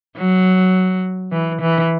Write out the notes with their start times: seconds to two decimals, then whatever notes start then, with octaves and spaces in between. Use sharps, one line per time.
0.17 F#3
1.32 E3
1.61 E3